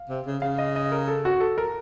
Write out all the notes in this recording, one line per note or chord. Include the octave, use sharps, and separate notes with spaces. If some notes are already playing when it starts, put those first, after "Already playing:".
Already playing: F5
C3
C#3
C#3 F5
D#5
D#5
A#4
A4
F#4
A4
A#4